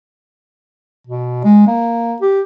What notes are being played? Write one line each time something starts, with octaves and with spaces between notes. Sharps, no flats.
B2
G#3
A#3
G4